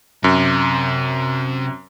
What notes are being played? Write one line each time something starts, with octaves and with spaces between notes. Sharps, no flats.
F#2 C3